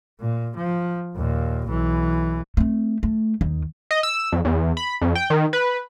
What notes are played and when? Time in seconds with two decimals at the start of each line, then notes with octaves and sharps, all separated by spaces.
0.20 A#2
0.56 F3
1.15 D#2 A#2
1.68 B1 E3
2.57 A3 C4
3.03 A3
3.41 D#2 D#3
3.91 D#5
4.03 E6
4.32 F2
4.45 E2
4.77 B5
5.02 F2
5.15 G5
5.30 D#3
5.53 B4